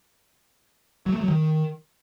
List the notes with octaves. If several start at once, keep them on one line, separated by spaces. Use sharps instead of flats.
F#3
A3
F#3
D#3